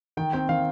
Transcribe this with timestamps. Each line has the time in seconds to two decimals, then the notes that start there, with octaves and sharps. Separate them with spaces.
0.17 D#3 G5
0.33 C4 G5
0.49 D#3 F5